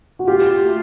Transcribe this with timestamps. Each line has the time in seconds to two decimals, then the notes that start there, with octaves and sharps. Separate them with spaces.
0.19 F#4
0.28 F4 G4
0.61 A3